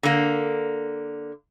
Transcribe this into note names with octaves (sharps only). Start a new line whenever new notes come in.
D3 A#3